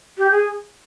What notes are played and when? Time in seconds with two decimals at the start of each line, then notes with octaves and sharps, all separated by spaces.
0.18 G4
0.31 G#4